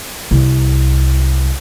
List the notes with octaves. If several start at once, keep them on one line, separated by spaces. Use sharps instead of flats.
C2